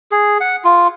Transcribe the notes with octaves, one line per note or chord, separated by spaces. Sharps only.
G#4
F#5
F4